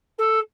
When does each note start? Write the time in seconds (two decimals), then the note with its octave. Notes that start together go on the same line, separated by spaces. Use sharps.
0.18 A4